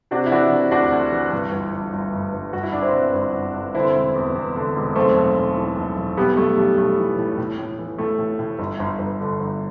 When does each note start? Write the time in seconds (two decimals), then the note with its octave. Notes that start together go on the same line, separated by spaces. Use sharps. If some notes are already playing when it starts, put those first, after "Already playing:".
0.11 C3 D4 F#4
0.26 E4
0.31 E3 D4 F#4
0.51 C3
0.71 D2 D4 F#4
0.92 D2
1.12 E3
1.32 G2
1.52 G1
1.72 G1
1.93 G1
2.13 G1
2.34 G1
2.53 G1 F#4
2.63 E4
2.73 G1 D4
2.82 C4 E4
2.94 G2
3.14 G1
3.34 G1
3.54 G1
3.75 D3 C4 E4
3.95 E1
4.15 E2
4.35 E2
4.56 D3
4.76 E1
4.95 B1 A3 C4
5.16 B1
5.36 B1
5.56 E3
5.76 B1
5.96 B1
6.17 B1 G3 B3
6.37 B1 A3
6.57 B1 G3
6.77 B1 A3
6.98 E3
7.18 A2
7.38 A2
7.58 A2
7.79 E3
7.98 A2 A3
8.18 A2
8.39 A2
8.59 G1
8.80 G1
8.99 G1
9.20 D3
9.40 G1